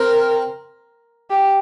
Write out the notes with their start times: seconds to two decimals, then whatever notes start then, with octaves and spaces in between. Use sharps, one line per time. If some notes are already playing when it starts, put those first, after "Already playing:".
Already playing: C4 A#4
1.30 G4